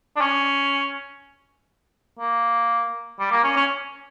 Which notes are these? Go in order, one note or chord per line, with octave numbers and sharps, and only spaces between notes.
D4
C#4
A#3
G3
A#3
C#4
C#4